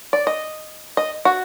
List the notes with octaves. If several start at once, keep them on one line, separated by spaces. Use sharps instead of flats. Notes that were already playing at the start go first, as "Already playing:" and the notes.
D5
D#5
D#5
F#4